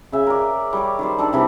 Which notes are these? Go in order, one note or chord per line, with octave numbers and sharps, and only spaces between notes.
C#3 E5 G#5
A#4 D5
G3 C#5 D6
D#3 G3 C5
D4 D#4 A4 D5
C3 E3 G3